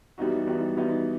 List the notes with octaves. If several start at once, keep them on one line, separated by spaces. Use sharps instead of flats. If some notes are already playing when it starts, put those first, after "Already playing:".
E3 G3 B3 D#4 F#4
E3 G3 B3 D#4 F#4
E3 G3 B3 D#4 F#4